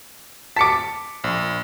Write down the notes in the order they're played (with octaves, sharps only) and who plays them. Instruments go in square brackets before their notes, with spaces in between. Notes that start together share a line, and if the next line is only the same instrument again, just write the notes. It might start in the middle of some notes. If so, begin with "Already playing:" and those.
[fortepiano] A5 D6 [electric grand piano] B6 C#7
[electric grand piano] A#1